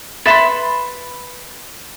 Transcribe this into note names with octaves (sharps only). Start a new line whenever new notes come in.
B4 E5 B5 C6 A6